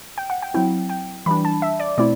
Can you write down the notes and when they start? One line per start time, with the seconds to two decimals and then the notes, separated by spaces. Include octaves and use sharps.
0.18 G5
0.30 F#5
0.42 G5
0.54 F#3 C4 E4 G5
0.90 G5
1.26 E3 G3 D4 B5
1.45 A5
1.62 E5
1.80 D5
1.98 B2 A3 C4 E4 D5